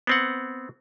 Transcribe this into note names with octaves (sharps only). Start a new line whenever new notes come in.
B3 C4 F#5